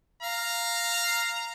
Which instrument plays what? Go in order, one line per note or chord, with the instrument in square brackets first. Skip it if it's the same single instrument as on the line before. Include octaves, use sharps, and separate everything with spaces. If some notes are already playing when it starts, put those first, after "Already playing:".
[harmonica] F5 [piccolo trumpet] A#5